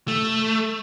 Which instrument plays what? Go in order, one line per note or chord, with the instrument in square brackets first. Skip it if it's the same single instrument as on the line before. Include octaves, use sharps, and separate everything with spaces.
[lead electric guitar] A3